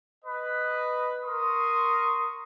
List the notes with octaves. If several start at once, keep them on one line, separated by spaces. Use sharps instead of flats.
B4 D#5
A#4 C6 C#6 D#6